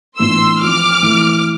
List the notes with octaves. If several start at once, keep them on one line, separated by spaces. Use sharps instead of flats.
A2 E3 B3 D4 F4 C6 E6
F3 C4 F4 D6 F6
E3 A3 E4